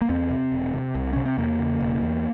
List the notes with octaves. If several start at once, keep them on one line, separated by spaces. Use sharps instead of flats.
A#3
E2 C4
C3
E1
C3
C2
C3 C#4
C4
E2 A#3
C#3
E1
E2